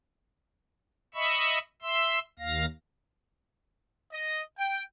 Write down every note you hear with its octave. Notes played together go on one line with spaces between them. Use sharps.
D#5 E5 B5 C#6 E6
E5 C6 E6
D#2 F5 A#6
D#5
G5